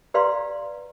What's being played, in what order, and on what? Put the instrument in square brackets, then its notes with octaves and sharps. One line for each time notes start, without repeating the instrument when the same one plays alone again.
[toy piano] G4 B4 D5 F5 A#5 C6